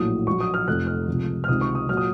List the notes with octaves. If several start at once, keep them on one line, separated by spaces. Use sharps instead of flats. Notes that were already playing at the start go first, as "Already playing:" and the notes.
Already playing: A#1 A2 F#3 D#6
A#1 A#2 F#3 C#6
D#6
F6
F1 F2 C3 F#6
F6
C#2 C3 F3
F6
C#2 C3 D#3 D#6
C#6
D#6
A#2 F#3 F6
D#6